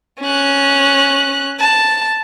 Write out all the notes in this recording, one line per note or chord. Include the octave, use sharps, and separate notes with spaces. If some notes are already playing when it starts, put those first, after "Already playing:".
C#4 F#6
A5